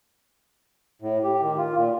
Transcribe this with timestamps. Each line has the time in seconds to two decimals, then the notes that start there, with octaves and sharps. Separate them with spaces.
1.02 A2
1.24 G4
1.42 D#3
1.58 F4
1.76 A#2